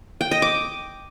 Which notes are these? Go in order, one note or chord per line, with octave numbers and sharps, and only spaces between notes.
G5
D#5
D6